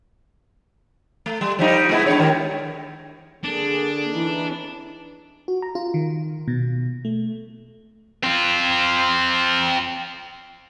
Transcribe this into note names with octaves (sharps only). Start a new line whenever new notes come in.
A3
G3
F3 G3 D#4
G#3 B3 E4
G#3 D4 C#5
D#3 G4 A#4
D3 A#3 D4 G#4
E3 D#4
F#4
A#5
F4
D#3
B2
A3
C4 F4